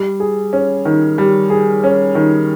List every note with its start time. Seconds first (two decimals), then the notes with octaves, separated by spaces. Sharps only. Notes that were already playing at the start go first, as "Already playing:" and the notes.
Already playing: G3
0.20 G#4
0.53 C#4
0.85 D#3
1.18 G3
1.50 G#4
1.84 C#4
2.15 D#3